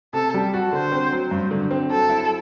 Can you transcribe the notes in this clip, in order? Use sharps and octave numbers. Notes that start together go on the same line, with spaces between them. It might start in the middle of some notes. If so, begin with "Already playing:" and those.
C3 A4
G3
F#4
D3 C5
C4
F#3
G2
D3
C4
F#3 A4
E4